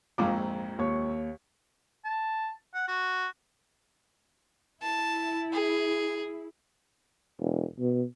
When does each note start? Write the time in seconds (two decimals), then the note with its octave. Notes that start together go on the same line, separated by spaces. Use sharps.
0.18 A#1 F2 G#2 F5 D6
0.31 F3
0.78 D#2 C#5 C#6
2.05 A5
2.74 F#5
2.88 F#4
4.82 E4 A5
5.53 G#4
7.39 E1
7.79 B2